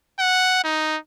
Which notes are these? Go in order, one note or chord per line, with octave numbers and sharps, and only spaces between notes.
F#5
D#4